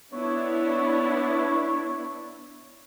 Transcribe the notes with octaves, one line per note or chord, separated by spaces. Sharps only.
B3 D4 E4 C#5